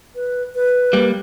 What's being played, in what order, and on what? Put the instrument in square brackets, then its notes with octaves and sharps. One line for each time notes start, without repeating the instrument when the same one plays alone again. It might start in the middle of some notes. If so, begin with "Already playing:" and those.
[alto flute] B4
B4
[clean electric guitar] G3 A#3